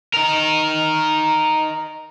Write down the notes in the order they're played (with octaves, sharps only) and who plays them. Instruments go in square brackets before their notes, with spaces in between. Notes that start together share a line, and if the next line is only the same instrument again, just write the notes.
[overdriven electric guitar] D#4 A#4